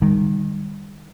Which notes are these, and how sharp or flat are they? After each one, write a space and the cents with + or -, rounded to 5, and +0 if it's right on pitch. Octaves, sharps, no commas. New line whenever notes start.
D#3 -20 G3 +35